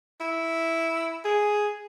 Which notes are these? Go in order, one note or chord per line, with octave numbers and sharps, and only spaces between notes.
E4
G#4